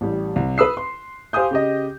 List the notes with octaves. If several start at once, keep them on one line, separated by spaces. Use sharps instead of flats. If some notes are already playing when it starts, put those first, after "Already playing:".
A1 G3
C2
B4 D#6 E6 C7
C6
G4 C5 F5 G#5 D#6 G6
C#3 G4 D#5